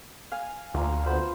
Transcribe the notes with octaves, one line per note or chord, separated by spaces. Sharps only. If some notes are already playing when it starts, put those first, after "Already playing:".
F5 G#5
D2 A#3 F4
B3 C5 B5